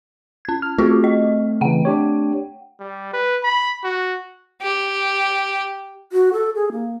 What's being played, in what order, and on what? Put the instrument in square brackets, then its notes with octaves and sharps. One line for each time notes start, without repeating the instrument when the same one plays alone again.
[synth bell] C#4 G#6
[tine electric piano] F6
[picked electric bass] A3 C4 [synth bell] F4 F#4 G#4
[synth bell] D#5
[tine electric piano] C#3 E3 [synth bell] F#5 G5
[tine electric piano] D4 G4 C#5
[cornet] G3
B4
B5
F#4
[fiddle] G4
[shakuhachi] F#4
A4
G#4
A#3